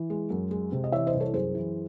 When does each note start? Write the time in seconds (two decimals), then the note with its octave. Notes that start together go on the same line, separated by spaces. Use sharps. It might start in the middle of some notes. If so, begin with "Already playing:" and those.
Already playing: E3
0.10 G#3
0.30 F#2
0.51 G#3
0.72 C3
0.84 D#5
0.92 E3 C#5 E5
1.07 C5 D#5
1.14 C2
1.20 A4 C#5
1.34 F#2 G#4 C5
1.55 E3